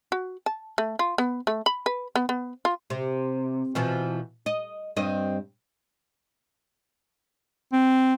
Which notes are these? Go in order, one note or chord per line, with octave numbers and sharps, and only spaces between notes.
F#4
A5
A3
F4
B3
A3
B5
B4
B3
B3
F4
C3
B2 E3 F3
D#5
G2 C4 D#5
C4